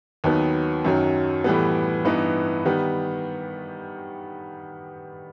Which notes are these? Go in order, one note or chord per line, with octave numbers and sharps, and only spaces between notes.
D#2 D#3 F#3 B3
F#2 D#3 F#3
A2 E3 G3 B3
G2 E3 B3 D#4
D#3 G3 B3